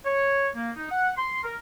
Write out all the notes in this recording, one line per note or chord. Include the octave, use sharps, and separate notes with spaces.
C#5
A#3
D#4
F#5
C6
A#4